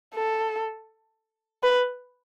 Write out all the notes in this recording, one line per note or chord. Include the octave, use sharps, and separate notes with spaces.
A4
B4